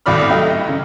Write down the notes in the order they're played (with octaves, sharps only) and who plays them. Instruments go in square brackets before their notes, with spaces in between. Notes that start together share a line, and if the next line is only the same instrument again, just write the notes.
[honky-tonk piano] C2 A2 F#4 D5 B5 F6
F#3 A3 E4 G4 D#5
C#3